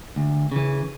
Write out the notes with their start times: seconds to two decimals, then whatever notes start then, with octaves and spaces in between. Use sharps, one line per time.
0.16 D2
0.52 C#3 E3